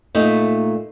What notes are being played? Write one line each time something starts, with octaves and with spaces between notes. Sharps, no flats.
A#2 A3 D#4